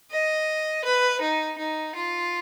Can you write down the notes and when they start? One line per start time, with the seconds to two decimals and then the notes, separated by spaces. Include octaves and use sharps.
0.11 D#5
0.84 B4
1.21 D#4
1.58 D#4
1.95 F4